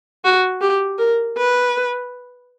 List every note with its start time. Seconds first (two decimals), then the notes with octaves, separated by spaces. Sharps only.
0.25 F#4
0.61 G4
0.98 A#4
1.37 B4